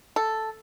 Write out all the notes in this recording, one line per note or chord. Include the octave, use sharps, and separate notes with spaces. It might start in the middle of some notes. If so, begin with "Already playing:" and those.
A4